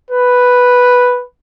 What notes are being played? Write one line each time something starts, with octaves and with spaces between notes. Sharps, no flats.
B4